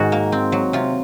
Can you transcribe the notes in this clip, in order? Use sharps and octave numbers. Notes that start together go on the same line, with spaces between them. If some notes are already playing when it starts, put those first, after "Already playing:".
Already playing: G#2 D#3 F#4
A#3
C4
F#3
C3 F4